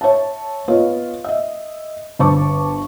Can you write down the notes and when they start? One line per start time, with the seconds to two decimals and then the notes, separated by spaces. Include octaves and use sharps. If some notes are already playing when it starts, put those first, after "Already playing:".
0.01 C#5 E5 A5
0.68 B3 F4 C#5 D#5
1.24 D#5 E5
2.19 G1 C5 A5 C#6 D6